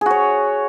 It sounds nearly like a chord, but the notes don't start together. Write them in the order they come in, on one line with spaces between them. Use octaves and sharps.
G#4 F#4 C#5